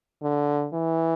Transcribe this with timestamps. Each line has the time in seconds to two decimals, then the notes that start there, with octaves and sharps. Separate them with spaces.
0.23 D3
0.74 E3